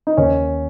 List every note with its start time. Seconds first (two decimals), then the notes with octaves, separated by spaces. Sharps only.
0.07 D#4
0.17 D#2 C#4